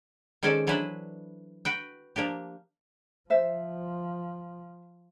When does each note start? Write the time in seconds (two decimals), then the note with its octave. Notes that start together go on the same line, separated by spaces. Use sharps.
0.43 D#3 G#3 C4 C#4 A4 D5
0.67 E3 F#3 D4 E4 B4 C5
1.65 F#4 B4 G5
2.16 F3 A#3 D4 G4
3.30 F3 C5 E5